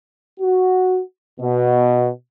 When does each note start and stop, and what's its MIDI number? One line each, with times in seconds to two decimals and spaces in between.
0.40 1.01 66
1.40 2.09 47